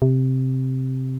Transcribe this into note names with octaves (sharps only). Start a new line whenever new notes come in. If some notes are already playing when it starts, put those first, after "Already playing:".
C3